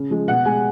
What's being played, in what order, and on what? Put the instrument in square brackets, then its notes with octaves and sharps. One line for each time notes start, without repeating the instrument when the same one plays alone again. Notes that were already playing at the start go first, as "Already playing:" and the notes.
Already playing: [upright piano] C#3
F3 G#3
B2 F#5
G#3 G#5